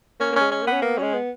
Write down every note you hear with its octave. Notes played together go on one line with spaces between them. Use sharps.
A#3 C#4
A#3
G#3 C#4
C#4
A#3
B3 C#4
A#3 B3
F#3 G#3 C#4
B3